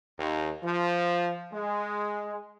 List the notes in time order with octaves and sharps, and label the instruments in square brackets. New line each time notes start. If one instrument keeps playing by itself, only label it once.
[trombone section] D#2
F3
G#3